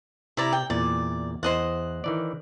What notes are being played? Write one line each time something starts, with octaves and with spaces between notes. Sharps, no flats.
C3 E4 D5 A#5
G5
E2 A#2 D5
E2 C5 D#5 F#5
D#3 E3 D5